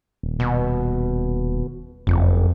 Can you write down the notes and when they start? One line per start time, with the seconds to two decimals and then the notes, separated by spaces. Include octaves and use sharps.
0.23 D#1
0.40 B2
2.07 F#1 F2